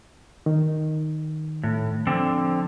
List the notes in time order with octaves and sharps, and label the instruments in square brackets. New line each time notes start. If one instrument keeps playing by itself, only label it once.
[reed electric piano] D#3
[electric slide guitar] A2
D3 F3 C4